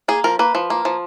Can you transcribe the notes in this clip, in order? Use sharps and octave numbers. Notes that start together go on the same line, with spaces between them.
A#3 G#4
F3 A#4
A#3 B4
F3
A#3
F3